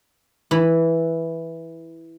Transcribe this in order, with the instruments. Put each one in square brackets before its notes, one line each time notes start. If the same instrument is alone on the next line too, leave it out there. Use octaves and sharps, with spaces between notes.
[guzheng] E3 B5